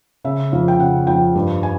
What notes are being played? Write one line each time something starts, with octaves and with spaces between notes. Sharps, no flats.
C#3 E5
F2 F5
G5
C#3 F#5
F2 G5
G2
G#5